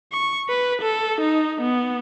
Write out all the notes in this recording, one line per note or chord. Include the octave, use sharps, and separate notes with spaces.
C#6
B4
A4
D#4
B3